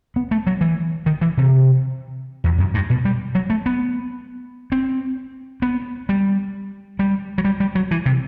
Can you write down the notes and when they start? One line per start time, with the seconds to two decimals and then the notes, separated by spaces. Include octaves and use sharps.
0.16 B3
0.31 A3
0.47 F#3
0.61 E3
1.06 D#3
1.21 E3
1.37 C3
2.44 E2
2.58 F#2
2.74 G2
2.90 B2
3.05 G3
3.35 F#3
3.50 A3
3.66 B3
4.72 C4
5.62 B3
6.09 G3
6.99 G3
7.38 F#3
7.45 G3
7.60 G3
7.75 F#3
7.91 E3
8.06 C3